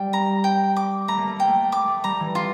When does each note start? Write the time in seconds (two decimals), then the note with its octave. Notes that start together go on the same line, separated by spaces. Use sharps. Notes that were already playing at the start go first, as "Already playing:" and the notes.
Already playing: G3 G5
0.13 A#5
0.44 G5
0.77 D6
1.08 A3 A#5
1.18 A#3
1.27 A3
1.36 A#3 G5
1.47 A3
1.72 D6
1.88 A3
2.04 G3 A#5
2.20 E3
2.35 F4